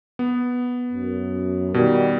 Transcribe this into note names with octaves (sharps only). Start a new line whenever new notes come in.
B3
F#2
B2 D#3 G3